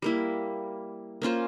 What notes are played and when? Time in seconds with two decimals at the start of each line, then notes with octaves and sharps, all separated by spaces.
0.02 G3 A#3 E4
1.22 A#3 C#4 F4 C5